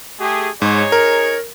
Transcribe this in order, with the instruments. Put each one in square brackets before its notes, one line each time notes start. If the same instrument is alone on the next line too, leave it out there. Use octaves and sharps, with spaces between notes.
[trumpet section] A3 G4 G#4
[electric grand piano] G#2 [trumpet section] D#4 G#4 C#5
[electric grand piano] A#4